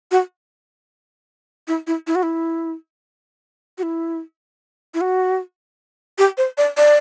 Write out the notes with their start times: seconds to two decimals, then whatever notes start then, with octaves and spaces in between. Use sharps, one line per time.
0.11 F#4
1.68 E4
1.87 E4
2.07 E4
2.15 F#4
2.23 E4
3.78 F#4
3.83 E4
4.94 E4
5.01 F#4
6.18 G4
6.37 C5
6.58 D5
6.77 D5